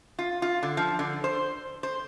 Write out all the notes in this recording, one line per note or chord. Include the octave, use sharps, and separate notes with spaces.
F4
F4
D3
F3
D3
C5
C5